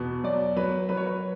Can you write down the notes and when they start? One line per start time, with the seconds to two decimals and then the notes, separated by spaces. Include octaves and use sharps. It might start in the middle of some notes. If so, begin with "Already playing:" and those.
Already playing: E2 B2
0.23 F#3 D5
0.56 F#3 B4
0.89 F#3 B4
0.97 C#5
1.06 B4